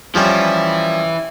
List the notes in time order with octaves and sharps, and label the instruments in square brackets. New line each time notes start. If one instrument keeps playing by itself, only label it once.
[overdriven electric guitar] E3 E4 [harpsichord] F3 G3 C#4